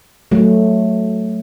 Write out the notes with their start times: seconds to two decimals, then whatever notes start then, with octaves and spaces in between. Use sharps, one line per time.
0.31 F#3 A3